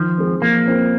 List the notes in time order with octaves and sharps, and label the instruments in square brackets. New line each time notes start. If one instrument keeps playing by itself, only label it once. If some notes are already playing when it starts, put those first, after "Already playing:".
Already playing: [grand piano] D#3 [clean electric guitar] F3
[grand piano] G#3 C4
[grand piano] F3 [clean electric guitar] A#3
[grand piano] C4 F4 A#4